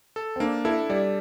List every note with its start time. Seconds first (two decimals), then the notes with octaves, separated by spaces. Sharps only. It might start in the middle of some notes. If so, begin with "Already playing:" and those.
0.16 A4
0.36 C4
0.40 A#3 D4
0.65 E4 A4
0.90 G3 D5